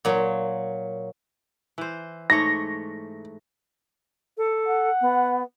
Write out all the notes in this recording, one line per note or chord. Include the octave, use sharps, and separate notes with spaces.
A#2 F#3
E3 C5
G#2 A3 C#5 A#6
A4
F#5
B3